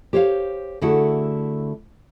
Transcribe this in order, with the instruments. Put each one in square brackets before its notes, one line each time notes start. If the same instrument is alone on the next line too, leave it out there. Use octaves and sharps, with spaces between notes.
[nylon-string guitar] G4 C5 C#5 E5 F5
D3 A3 E4 F#4 G#4 F#5